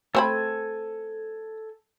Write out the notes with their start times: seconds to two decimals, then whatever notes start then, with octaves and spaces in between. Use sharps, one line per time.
0.15 A3 C4 A4 G#5 B5